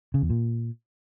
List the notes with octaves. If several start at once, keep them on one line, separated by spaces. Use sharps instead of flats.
C#3
E2
A#2